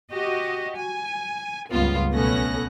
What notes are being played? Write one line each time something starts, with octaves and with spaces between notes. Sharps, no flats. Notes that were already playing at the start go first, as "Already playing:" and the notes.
F#4 G4 D#5
G#5
C#2 G2 A#2 B3 F4
B1 A3 B3 C#4 F#6 A#6